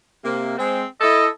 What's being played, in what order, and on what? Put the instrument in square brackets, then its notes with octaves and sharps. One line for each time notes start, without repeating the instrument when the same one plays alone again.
[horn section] C3 A#3
G#3 C4
[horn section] E4 A4 [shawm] D#5